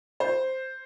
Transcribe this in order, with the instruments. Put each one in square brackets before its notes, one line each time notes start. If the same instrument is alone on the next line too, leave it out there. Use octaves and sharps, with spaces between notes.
[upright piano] C5